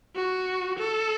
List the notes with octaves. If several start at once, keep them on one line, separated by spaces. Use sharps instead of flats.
F#4
A4